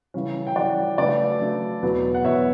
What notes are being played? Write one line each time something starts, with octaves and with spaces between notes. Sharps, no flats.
C#3 E3 G3 C#4
G5
C#3 E3 G3 C#4 D5 F#5
C#3 F#3 A3 D4 B4 D5
C#3 F#3 A3 D4
E2 B2 F#3 B3
F#5
E2 B2 F#3 B3 C#5 E5